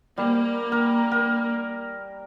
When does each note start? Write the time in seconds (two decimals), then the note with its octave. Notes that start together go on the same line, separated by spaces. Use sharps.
0.18 G3 A#3
0.72 A#4
1.11 A#4